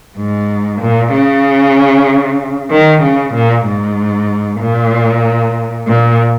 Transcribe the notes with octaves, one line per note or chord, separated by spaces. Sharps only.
G#2
A#2
C#3
D#3
C#3
A#2
G#2
A#2
A#2